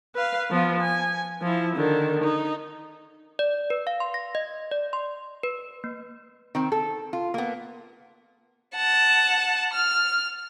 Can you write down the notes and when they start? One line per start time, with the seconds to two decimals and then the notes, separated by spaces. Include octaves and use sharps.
0.16 B4 F5
0.50 F3 B3
0.81 G#5
1.42 F3 E4
1.76 D3 D#3
2.24 D#4
3.39 D5
3.70 B4
3.87 F5
4.00 C6
4.14 A#6
4.35 D#5
4.71 D5
4.93 C6
5.43 B4
5.84 A#3
6.55 D#3 C4
6.72 A4
7.13 F4
7.34 A#3 B3
8.75 F#5 A5
9.74 F6